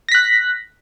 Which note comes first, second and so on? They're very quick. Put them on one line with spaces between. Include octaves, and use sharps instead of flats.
A#6 B6 F#6